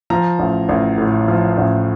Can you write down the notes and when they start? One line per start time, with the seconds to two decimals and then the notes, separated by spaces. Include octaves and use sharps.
0.10 F3 A#5
0.39 A1
0.69 A1
0.98 A2
1.28 F3
1.58 A1